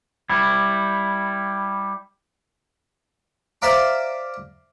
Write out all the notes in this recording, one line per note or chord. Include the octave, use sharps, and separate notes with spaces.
G3 E4
C5 D5 E5 F5 A#5 D6